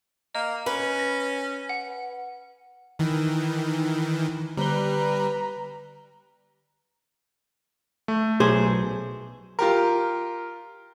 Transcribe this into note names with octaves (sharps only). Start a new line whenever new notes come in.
A#3 D#5
C#4 B4
A#6
F#5
D#3 E3
D3 G3 B4 A#5 G7
A3
B1 G#4 C5
F4 G4 A#4